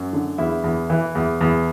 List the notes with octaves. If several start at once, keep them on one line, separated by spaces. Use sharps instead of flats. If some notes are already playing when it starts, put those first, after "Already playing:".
Already playing: F#2
D3
E2 E4
E2
E3
E2
E2